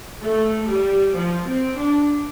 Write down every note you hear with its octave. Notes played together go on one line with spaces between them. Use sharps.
A3
G3
F3
C4
D4